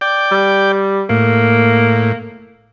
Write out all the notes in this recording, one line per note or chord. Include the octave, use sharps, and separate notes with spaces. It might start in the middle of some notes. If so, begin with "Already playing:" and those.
D5 G5
G3
A2 A#3